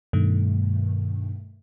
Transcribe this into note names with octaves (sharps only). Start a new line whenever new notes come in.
G2 B2 D#3 A3